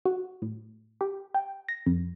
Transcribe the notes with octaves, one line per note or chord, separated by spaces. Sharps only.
F#4
A2
G4
G5
A#6
F2